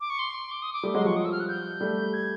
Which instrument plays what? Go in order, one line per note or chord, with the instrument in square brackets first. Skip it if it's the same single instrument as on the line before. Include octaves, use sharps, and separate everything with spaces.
[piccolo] D6
C#6
C6
D6
D#6
D6
[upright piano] G3 A3
[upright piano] F#3 G#3 [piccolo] C6
[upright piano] F3 G3 [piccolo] C#6
[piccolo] D#6
E6
F6
F#6
G6
[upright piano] G3 A3
[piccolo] G#6